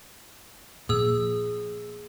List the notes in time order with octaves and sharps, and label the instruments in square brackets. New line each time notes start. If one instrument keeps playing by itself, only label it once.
[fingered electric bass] A#2 F3 [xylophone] G#4 E6